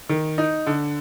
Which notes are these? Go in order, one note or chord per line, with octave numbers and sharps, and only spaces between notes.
D#3
D#4
D3